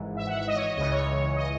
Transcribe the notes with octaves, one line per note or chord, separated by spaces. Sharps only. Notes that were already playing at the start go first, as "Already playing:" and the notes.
Already playing: G#1 G#2 E3
E5
F#5
E5
D#5
C#5
D#5
C#2 C#3 E3 D#5
C#5
D#5